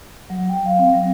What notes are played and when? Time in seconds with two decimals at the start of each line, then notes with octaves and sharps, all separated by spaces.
0.30 F#3
0.49 G5
0.66 F5
0.79 C4
0.94 F#3